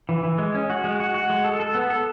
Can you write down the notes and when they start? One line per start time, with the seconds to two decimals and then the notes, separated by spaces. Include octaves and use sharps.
0.09 E3
0.23 E3
0.38 G#3
0.55 C#4
0.70 F#4
0.84 G#3
1.00 F#4
1.14 F#4
1.30 G#3
1.45 A4
1.60 A4
1.75 B3
1.90 A4